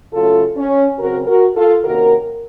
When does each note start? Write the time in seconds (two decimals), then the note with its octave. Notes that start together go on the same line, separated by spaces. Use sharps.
0.14 C#3 F#3 A3 C#4 F4 A4
0.56 C#4
0.99 C#3 F#3 C4 F#4 A#4
1.27 F#4 A#4
1.56 F4 A4
1.84 C3 D#3 A#3 C#4 F#4 A#4